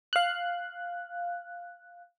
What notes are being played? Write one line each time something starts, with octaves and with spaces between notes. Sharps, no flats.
F5 F#6